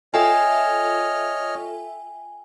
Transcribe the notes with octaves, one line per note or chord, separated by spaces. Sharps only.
F4 A4 C#5 D#5 E5 G5 G#5 F6